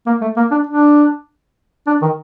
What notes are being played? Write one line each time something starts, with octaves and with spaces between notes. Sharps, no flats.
A#3
A3
A#3
D4
D4
D4
D#3